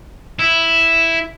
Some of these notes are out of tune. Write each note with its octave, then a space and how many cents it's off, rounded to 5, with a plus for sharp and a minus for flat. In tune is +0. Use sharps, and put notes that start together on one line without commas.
E4 +0